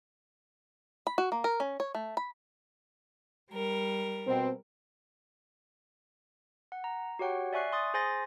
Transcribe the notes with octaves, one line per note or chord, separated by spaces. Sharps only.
B5
F#4
A#3
A#4
C#4
C#5
A3
B5
G3 A#4
B2 C4
F#5
A#5
F#4 G4 C#5 F#5 G5
D5 E5 G#5 C#6 F#6 C7
C6 D#6 A6
G#4 C5 G#5 C6 A6 A#6